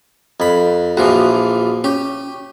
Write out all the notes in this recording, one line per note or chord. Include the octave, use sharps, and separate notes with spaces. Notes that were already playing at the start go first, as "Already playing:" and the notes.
F2 B5
A#1 E3 F3 F#4
C#4 G4